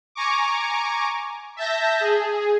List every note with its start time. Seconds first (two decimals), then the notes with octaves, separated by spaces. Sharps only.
0.15 G#5 A#5 C#6 D6
1.56 E5 A5 G6 A#6
2.01 G#4